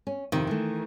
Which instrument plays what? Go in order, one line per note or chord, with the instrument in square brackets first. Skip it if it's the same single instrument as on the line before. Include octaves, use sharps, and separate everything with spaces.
[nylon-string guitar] C#4
[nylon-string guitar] F2 C3 [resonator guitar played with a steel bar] D#3
[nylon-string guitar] E3 A3